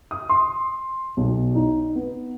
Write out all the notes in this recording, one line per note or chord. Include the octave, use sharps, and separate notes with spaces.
D#6
C6
B1
D#4
B3